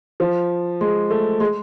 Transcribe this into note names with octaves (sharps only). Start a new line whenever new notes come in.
F3
G#3
A3
G#3